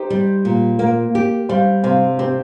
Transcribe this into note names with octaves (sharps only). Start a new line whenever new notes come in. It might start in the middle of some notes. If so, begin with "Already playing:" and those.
Already playing: D#4 G4 C5
G3
A#2
A#3
G4
G3 C5 F5
C3 C5 F5
C4 G4 C5